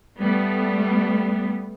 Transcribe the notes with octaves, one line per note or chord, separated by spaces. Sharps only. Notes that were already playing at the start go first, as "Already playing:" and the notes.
G3 A3 B3